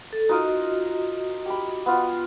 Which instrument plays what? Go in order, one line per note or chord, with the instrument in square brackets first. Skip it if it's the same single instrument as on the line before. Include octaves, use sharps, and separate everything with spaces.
[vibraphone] A4
[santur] D#4 F4 A#4 [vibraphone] F#4 D#5
[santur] G4 B5
B3 F4